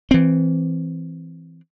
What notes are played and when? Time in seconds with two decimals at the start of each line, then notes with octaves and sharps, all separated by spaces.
0.11 E3 C4